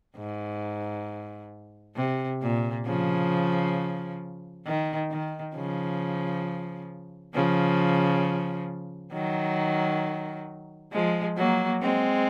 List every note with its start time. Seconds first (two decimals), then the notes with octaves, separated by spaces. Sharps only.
0.17 G#2
1.96 C3
2.42 A#2
2.86 C#3 F3
4.66 D#3
5.11 D#3
5.55 C#3 F3
7.34 C#3 F3
9.13 D#3 F#3
10.92 F3 G#3
11.37 F#3 A#3
11.82 G#3 C4